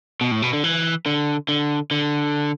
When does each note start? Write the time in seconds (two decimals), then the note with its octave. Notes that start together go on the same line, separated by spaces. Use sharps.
0.21 B2
0.32 A2
0.42 B2
0.53 D3
0.64 E3
1.06 D3
1.49 D3
1.91 D3